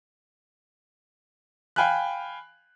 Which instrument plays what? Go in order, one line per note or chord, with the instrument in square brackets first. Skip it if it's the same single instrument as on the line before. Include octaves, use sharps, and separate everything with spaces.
[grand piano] F5 G5 G#5 B5 F6 F#6